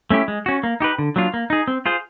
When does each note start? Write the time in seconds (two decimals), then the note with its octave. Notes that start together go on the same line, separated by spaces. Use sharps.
0.10 A3 C#4 E4 G4
0.28 G#3
0.46 C#4 F#4
0.63 A#3
0.80 D#4 G4 B4
0.98 D3
1.16 F#3 A#3 D4 F4
1.34 A#3
1.50 D#4 G#4
1.68 C4
1.86 F4 G#4 C5